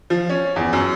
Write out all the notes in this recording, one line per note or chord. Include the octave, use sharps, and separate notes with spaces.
F3
C#4
E2
F#2